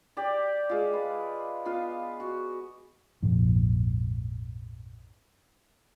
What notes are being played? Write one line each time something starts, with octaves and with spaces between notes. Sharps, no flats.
G4 D5
G#3 F4
B4
B3 F4 B4 F5
F#4
A#1 F2 G#2